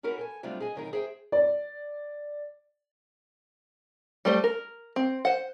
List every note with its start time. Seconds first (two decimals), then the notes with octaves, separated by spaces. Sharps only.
0.03 C#4 D#4 F#4 A#4 B4
0.17 A4 G5 G#5
0.43 C3 F#3 G3 A3 D4 F4
0.60 G#4 D#5 G#5
0.75 E2 B2 D#3 F#3 D#4 A#4
0.93 G#4 C5 E5 G5
1.32 D5
4.25 G3 A3 C5
4.44 A#4
4.96 C4
5.25 C5 F#5